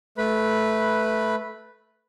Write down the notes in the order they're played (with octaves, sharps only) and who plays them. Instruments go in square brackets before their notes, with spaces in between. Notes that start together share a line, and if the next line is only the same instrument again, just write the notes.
[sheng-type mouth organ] A3 B4 B5